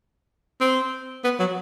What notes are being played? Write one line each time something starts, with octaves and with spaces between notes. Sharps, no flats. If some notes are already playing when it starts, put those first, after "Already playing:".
C4
B3
F#3